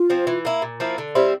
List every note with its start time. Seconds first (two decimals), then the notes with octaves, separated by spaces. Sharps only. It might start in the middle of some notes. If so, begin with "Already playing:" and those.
Already playing: F4
0.10 F3 C4
0.27 E3
0.45 A#3 E4
0.62 A#2
0.80 F3 A#3 E4
0.98 D3
1.15 G3 C4 E4